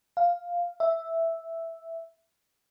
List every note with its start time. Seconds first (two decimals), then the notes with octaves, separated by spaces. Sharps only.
0.17 F5
0.80 E5